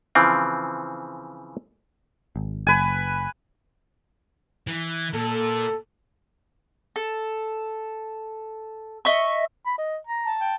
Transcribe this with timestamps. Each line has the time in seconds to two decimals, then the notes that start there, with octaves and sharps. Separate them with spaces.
0.15 C#3 E3 F3 C4
2.36 G#1
2.67 F#1 B4 G#5
4.67 E3
5.13 A#2 A4
6.96 A4
9.05 D#5 E5 C#6
9.66 B5
9.78 D#5
10.07 A#5
10.25 A5
10.40 G5